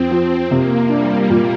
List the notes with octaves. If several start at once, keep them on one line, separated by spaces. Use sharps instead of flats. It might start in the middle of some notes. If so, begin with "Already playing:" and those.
Already playing: F2 C4
F3
C3 A#3
G3 D4
A#2